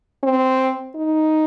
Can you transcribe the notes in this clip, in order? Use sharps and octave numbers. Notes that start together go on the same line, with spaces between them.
C4
D#4